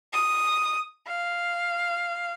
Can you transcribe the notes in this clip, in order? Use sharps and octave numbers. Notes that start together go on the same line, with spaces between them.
D#6
F5